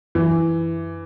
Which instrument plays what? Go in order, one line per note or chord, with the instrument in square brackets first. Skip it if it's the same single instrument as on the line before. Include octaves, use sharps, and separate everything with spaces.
[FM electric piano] F#2 [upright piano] E3